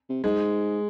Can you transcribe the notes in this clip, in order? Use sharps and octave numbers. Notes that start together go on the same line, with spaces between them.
C3
G#2 G#3